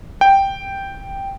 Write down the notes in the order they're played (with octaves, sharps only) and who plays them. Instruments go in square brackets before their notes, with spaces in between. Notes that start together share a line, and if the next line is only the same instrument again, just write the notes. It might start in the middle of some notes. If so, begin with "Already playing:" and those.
[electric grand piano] G5